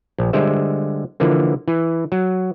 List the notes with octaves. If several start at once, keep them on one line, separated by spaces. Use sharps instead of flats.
A#1
D3 G3 G#3 C5 E5
D3 E3 F3 A#3
E3
F#3